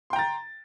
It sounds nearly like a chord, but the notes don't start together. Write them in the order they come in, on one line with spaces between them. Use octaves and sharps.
C6 G5 A#5 A6